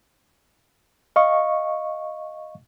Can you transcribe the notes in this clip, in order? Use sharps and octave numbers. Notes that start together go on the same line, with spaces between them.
D#5 F5 C#6